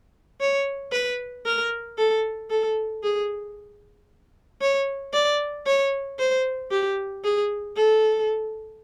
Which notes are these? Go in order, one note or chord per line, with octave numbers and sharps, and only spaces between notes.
C#5
B4
A#4
A4
A4
G#4
C#5
D5
C#5
C5
G4
G#4
A4